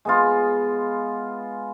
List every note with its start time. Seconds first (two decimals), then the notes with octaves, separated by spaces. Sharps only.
0.05 G#3 B3 F4